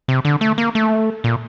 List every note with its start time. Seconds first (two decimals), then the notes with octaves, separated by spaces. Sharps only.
0.08 C3
0.25 D3
0.41 A3
0.58 A#3
0.75 A3
1.24 A#2